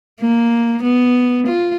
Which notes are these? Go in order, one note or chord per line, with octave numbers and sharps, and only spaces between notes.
A#3
B3
F4